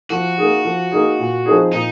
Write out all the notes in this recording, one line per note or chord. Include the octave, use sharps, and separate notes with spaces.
F3 F#4
A#3 D#4 G#4
F3
A#3 D#4 G#4
A#2
F3 C4 D#4 G#4
A#2 D#4